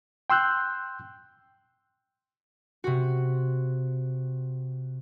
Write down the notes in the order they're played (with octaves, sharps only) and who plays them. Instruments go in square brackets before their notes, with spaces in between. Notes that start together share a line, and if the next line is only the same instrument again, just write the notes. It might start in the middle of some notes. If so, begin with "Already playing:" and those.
[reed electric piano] G5 C6 E6 F#6 G6
[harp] C3 F#4